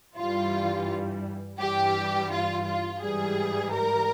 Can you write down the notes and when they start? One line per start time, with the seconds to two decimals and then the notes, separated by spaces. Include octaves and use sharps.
0.18 G2 E3 G3 F4
1.59 G2 E3 G3 G4
2.31 F4
2.67 F4
3.01 G#2 E3 G3 G#4
3.72 A#4